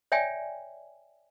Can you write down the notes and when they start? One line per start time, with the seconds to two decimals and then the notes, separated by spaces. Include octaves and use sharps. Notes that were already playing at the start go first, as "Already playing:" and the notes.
0.12 C#5 D5 E5 G5 G#5